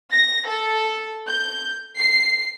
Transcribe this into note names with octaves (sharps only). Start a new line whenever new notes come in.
A#6
A4
G6
C7